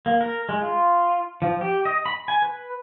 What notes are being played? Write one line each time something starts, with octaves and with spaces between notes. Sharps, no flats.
A#3
A#4
G#3
F4
F3
G4
D#5
B5
G#5
B4